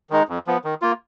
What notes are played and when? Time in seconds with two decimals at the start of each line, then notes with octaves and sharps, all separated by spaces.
0.10 D#3 G#3 D#4
0.28 F2
0.47 F3 B3
0.64 D#3
0.82 A#3 F4